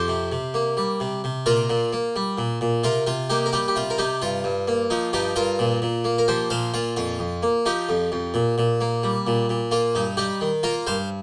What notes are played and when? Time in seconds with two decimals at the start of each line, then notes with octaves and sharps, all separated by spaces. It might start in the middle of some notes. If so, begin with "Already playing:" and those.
Already playing: F2 G4 C5
0.08 C3
0.32 C3
0.54 A#3
0.77 G3
1.00 C3
1.24 C3
1.46 A#2 F4 A#4
1.70 A#2
1.93 A#3
2.16 G3
2.38 A#2
2.61 A#2
2.84 C3 F4 A#4
3.07 C3 F4
3.30 A#3 D#4 G4
3.46 A#4
3.53 G3 D#4 G4
3.68 G4
3.76 C3 F4
3.90 A#4
3.98 C3 D#4 G4
4.22 G2 F4
4.44 G2
4.68 A#3
4.90 F3 D#4
5.13 G2 D#4 G4
5.36 G2 F4 A#4
5.59 A#2
5.82 A#2
6.04 A#3
6.18 A#4
6.28 F3 G4 C5
6.50 A#2 C5 F5
6.74 A#2 F4
6.96 F2 F4
7.19 F2
7.43 A#3
7.66 F3 D#4 G4
7.89 F2
8.12 F2
8.34 A#2
8.58 A#2
8.81 A#3
9.03 G3
9.27 A#2
9.49 A#2
9.71 A#3 F4
9.95 G2 D#4
10.17 G3 D#4 G4
10.41 D#3
10.63 A#3 F4 A#4
10.87 G2 C5 F5